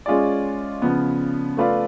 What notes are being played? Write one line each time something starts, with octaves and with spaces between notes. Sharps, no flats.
G#3 C#4 F4 G#4 D5
C#3 F3 B3
A3 F4 B4 D5 F5